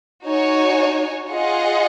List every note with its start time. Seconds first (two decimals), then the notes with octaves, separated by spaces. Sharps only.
0.24 D#4 F#4 C#5 G#5
1.31 F4 G#4 D#5 F#5